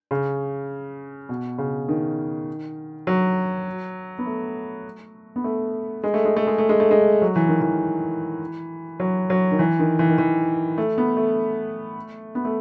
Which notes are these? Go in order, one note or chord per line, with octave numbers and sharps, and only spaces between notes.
C#3
B2
C#3
D#3
F#3
B3
A3
B3
A3
G#3
A3
G#3
A3
G#3
A3
G#3
A3
G#3
F#3
E3
D#3
E3
F#3
F#3
D#3
E3
D#3
E3
D#3
E3
A3
B3
A3
B3
A3